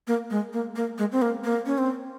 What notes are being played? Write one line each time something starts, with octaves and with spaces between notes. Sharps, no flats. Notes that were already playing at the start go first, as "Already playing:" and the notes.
A#3
G#3
A#3
A#3
G#3
C4
A#3
A#3
C#4
C4